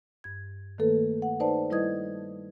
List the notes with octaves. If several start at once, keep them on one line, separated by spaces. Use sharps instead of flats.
G2 G#6
D#3 A3 A#3 A4 B4
F#5
D#4 B4 C5 D5 A5
G3 E4 B4 D#5 D#6 G#6